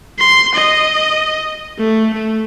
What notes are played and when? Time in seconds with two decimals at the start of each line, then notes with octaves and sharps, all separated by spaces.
0.19 C6
0.55 D#5
1.78 A3
2.13 A3